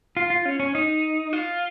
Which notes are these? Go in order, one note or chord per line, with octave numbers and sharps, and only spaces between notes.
F4
F4
C#4
C#4
D#4
F4